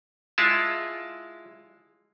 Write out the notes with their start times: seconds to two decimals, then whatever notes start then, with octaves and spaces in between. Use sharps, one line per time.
0.38 G#3 E4 F4 A5